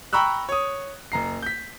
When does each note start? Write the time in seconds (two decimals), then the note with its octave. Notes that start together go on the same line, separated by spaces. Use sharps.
0.13 G5 A#5 B5 C#6 E6 F#6
0.49 C#5 D#6
1.12 F#1 A#5 C7
1.42 G6 B6